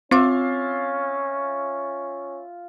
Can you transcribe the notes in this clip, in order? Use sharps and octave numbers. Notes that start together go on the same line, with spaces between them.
C4 C#4 F4 E5 D6